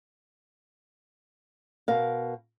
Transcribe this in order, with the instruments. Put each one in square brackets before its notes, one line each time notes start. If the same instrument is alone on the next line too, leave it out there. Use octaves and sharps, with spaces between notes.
[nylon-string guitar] B2 A#4 F5